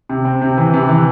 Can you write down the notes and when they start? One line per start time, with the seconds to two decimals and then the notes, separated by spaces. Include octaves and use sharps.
0.09 C3
0.25 C4
0.42 C3
0.57 E3
0.74 C3
0.89 E3